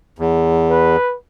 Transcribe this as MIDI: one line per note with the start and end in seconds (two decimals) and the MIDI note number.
0.19 0.96 40
0.70 1.15 71